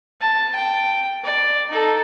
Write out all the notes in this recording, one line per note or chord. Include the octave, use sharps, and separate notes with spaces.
A5
G5
D5
D#4 A4